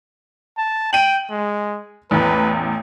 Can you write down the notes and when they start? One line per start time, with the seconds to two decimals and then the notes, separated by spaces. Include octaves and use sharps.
0.58 A5
0.93 G5 D#7 F#7
1.30 G#3
2.11 A1 E2 B4